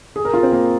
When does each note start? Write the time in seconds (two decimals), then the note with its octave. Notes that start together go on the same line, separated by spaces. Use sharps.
0.16 G#4
0.25 A#4
0.34 F4
0.43 C4
0.52 A#3